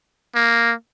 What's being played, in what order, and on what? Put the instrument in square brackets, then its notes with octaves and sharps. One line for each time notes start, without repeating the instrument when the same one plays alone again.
[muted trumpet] A#3